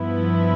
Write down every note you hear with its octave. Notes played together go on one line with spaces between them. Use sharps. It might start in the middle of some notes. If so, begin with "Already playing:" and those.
Already playing: G2 F3 B3 E4